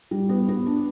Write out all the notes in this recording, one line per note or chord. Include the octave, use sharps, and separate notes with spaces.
G3
B3
B3
D4